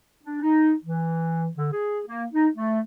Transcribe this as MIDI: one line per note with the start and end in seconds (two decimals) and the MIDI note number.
0.24 0.39 62
0.42 0.72 63
0.85 1.47 52
1.57 1.68 50
1.72 2.00 68
2.06 2.25 58
2.32 2.48 63
2.55 2.80 57